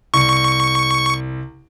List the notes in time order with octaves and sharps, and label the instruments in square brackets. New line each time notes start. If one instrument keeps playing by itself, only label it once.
[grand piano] C2 [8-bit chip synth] C#6